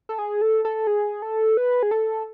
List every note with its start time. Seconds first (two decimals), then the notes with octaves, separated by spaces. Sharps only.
0.09 A4
0.18 G#4
0.41 A4
0.65 A4
0.87 G#4
1.22 A4
1.57 B4
1.83 G#4
1.91 A4